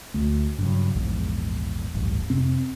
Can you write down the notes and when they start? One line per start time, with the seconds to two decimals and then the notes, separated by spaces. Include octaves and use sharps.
0.14 D2 A3
0.59 G2 C#3 F#3
0.95 A#1 E2 G#2
1.95 D1 A1 G2
2.30 F2 C3 C4